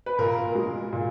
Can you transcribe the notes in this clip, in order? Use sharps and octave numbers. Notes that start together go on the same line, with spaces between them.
B4
A#2 A#4
G#3
A#2